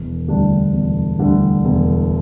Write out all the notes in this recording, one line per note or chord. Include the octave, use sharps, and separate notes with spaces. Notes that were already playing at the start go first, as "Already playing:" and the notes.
Already playing: E1
D2 D3 G3 D4
E1
D2 D3 G3 D4
E1